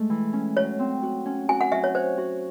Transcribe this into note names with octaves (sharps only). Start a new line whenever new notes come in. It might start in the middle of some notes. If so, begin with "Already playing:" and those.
Already playing: G#3 A3
E3
C#4
F#3 C#5
C4
F#4
C#4
F#4 G#5
F#5
F#3 E5
C#5
C5 C#5
F#4